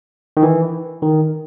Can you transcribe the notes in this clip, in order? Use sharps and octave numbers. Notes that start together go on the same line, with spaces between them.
D#3
E3
D#3